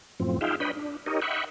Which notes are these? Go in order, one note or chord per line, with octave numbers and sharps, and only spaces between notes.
F#2 A2 F3 C4
D#4 F4 G#4 E5 F5 G5
D4 B4 C#5 D#5 G5 B5
D4
D#4 G4 A#4 C#5 D#5
D#5 E5 F#5 G5 B5 C#6